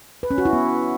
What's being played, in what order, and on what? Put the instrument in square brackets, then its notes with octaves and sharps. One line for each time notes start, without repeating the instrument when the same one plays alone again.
[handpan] B4
C#4
F#4
E4
B3